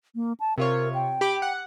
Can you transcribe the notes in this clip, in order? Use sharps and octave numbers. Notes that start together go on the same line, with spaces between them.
A#3
A5
C3 F4 A#4 C#5
G5
G4 B5 D6
F#5